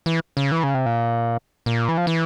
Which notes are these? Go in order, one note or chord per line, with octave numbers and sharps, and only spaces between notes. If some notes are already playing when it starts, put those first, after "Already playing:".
E3
C#3
E3
C#3
C3
A#2
A#2
E3
F3
E3